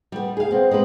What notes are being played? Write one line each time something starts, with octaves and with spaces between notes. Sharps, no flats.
G3 B3
G#4 F5
B3 C4
G#3 B3 C4 B4